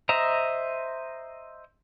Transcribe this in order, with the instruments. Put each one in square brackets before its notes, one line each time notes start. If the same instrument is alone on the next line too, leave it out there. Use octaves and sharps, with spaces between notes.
[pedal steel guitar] C5 D#5 E5 A#5